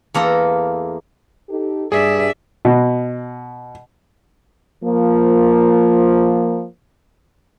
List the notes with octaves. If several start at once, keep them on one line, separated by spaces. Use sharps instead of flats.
E2 A#3 A4 A#5
D#4 G4 A4
G2 G#4 D5 E5
B2
F3 A#3